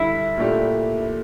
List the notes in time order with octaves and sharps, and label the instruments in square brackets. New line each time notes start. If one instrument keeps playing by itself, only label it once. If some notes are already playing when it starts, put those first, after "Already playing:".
Already playing: [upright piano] D3 G3 D4 [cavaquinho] E4
[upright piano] A#2 A3 D4 G4